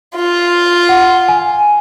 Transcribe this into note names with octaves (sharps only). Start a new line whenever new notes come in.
F4
F#5
G#5